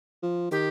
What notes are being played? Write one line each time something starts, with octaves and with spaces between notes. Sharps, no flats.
F3
D#3 G4